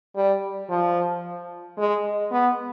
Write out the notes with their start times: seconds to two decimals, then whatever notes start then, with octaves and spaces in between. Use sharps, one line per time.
0.16 G3
0.70 F3
1.78 G#3
2.31 B3